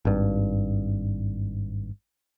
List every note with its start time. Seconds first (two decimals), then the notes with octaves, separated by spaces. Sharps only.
0.05 G#1 G2